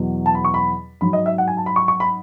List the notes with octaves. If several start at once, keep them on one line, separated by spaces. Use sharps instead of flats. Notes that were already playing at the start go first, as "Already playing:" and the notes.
Already playing: E2 B2 F#3
A5
B5
C#6
B5
G#2 F#3 B5
D#5
E5
F#5
G#5
A5
B5
C#6
C#6
B5